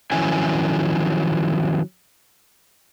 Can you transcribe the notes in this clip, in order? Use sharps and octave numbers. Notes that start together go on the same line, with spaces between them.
D#3 F3 F#3 C#4 E4 G#5